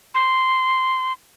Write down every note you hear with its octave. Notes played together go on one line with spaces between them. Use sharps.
C6